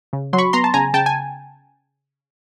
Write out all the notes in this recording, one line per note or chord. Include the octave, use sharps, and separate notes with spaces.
C#3
F#3 C6
B5 C#6
B3 A#5 C6
A5
C#3 G#5 A#5
C#3 G5 A5
G#5